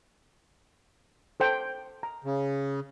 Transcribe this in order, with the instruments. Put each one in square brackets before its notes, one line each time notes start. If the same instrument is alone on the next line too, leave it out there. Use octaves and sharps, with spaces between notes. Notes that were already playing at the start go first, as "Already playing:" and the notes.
[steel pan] A4 C5 G5
A#5
[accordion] C#3